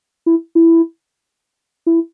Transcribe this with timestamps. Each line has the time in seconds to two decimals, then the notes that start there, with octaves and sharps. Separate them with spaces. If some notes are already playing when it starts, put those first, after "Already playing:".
0.26 E4
0.55 E4
1.86 E4